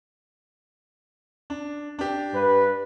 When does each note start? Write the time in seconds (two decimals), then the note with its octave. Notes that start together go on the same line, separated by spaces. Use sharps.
1.50 D4
1.99 D4 G4
2.34 G2 B4